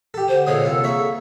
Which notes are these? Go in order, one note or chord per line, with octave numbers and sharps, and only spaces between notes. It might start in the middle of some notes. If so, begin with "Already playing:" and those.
G4 A4
D3 C5
A#2 G#3 A4 C#5 D#6
C2 F4
A#3 G#4 C#5 E5